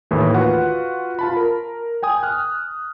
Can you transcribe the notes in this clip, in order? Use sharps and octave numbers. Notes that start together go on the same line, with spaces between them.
D#2 A2 E3
F4 F#4 B4 F#5
F4 A5 B5
A#4
G5 G#5 D#6
F6 F#6